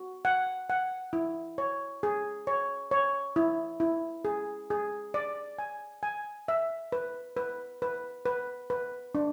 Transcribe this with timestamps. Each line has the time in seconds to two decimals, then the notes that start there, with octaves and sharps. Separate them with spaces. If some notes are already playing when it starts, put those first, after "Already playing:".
Already playing: F#4
0.25 F#5
0.70 F#5
1.13 E4
1.58 C#5
2.03 G#4
2.47 C#5
2.91 C#5
3.36 E4
3.80 E4
4.25 G#4
4.70 G#4
5.14 D5
5.59 G#5
6.03 G#5
6.48 E5
6.92 B4
7.37 B4
7.82 B4
8.26 B4
8.70 B4
9.15 D4